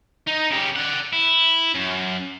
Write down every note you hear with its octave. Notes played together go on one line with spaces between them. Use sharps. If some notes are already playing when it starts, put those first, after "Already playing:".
D#4
C#3 G4
D5 F#5
E4
F#2